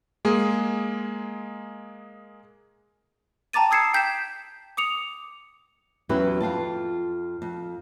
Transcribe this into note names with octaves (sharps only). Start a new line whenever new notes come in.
G#3 A#3 G#4
G5 A5 A#5 D6 A6 D#7
D#6 E6 G#6 C7 C#7 E7
G5 G6 B6 C7 E7
D6 D#6 C#7 F7
E2 F#3 C#4 E4 G4 B4
F2 F4 G4 A5
F2